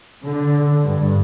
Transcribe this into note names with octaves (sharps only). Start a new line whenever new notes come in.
D3
G2